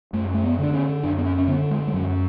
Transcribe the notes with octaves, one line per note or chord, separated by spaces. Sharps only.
F#2 A3
A3
B3
D3 D4
C#4
F#2 D4
B3
C#4
C#4
D3 B3
G#3
G#3
F#2 F#3